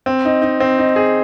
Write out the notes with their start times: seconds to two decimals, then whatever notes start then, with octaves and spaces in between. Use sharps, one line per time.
0.06 C4
0.25 D#4
0.42 D#4
0.60 C4
0.78 D#4
0.96 G#4